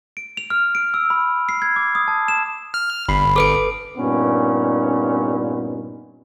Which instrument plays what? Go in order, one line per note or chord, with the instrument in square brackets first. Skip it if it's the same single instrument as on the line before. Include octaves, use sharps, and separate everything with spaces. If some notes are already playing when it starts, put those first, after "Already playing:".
[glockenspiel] D7
F7
F6
D7
E6
B5
C7
G#6
D6
D#6
A5
E7
[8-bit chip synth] F6
[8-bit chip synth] G1 [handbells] B5 C7
[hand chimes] A4 B4 D7 [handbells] D6
[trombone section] G2 A#2 B3 C#4 D#4